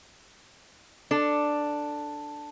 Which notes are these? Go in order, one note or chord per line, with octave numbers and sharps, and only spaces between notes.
D4 A4